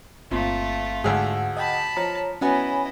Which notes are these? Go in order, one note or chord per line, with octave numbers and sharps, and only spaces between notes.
G1 A#2 A3 C4 F4 C6
D2 G#2 G#4 F#5 E6
D#5 G5 A5 B5
F3 C#5 A#5
F#3 B3 C#4 E4 C#5 D#5 G#5 B5